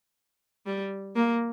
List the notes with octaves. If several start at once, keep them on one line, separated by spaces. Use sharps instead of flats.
G3
A#3